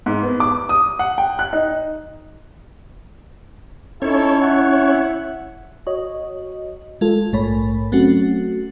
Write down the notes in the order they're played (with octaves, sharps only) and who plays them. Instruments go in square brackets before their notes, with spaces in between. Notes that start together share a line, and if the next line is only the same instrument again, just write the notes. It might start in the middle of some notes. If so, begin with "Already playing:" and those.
[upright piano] G#2
B3
D6
D#6
F#5
G5
F#6
D#4
[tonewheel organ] C#4 C#5 [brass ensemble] D#4 E4 A4
[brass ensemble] E4 E5 F#5
[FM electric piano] F#4 C#5 D#5
G#3 F4 A4
A#1 G#2 A3 C#5 B5
F#3 A3 C4 C#4 F#4